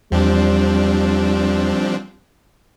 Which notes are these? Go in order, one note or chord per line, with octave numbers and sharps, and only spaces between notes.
E2 F3 G3 C4 D4